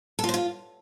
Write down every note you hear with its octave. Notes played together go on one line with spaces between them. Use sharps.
A4
F4
C5
F4